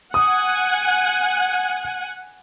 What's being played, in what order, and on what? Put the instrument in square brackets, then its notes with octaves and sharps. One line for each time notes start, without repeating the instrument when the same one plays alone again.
[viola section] F#5 G#5 [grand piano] D#6